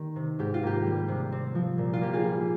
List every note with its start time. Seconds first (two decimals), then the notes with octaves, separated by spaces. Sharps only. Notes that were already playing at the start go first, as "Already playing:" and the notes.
Already playing: D#3 A#3 G4
0.16 C3
0.39 G#2 G4
0.54 F4
0.63 A#3 G4
0.86 G3
1.08 C3
1.32 C4
1.55 F3
1.78 A#2
1.93 F4
2.01 A#3 G4
2.13 F4 G#4
2.24 G3